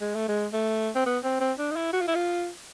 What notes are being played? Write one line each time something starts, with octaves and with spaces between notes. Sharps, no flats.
G#3
A3
G#3
A3
C4
B3
C4
C4
D4
D#4
E4
F#4
F4
E4
F4